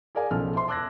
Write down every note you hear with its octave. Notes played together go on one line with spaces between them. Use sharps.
G#4 A#4 D5 F5 G#5
B1 C#3 F3 F4 A4 F6
C5 E5 C6
A5 D6 E6 F#6 G#6 A#6